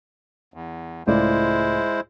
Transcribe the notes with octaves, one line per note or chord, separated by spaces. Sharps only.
E2
C#2 A2 G#3 E4 C5 D5